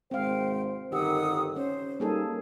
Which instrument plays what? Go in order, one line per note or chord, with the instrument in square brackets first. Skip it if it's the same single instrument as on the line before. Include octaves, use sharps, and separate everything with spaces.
[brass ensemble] G#1 G#3 C5 [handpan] C4 F5 [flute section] G5
[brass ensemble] G1 D#3 [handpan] D#4 G4 [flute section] F#5 D#6 E6
[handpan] C#4 [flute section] C5
[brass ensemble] G3 D#4 [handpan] A#3 G#4 A4